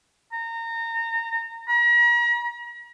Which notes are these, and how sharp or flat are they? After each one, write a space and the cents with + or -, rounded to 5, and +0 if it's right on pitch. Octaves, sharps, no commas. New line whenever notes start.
A#5 -25
A#5 +40